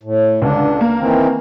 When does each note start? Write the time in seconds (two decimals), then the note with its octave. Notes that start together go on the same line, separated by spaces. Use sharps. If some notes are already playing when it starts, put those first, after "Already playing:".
0.03 A2
0.42 C#2 D3 D4
0.81 A#3
0.99 D#3 E3 C4